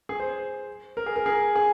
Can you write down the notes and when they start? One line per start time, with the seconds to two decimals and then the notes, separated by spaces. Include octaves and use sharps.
0.09 G#4
0.20 C5
0.97 A#4
1.06 G#4
1.16 A#4
1.26 G#4
1.56 G#4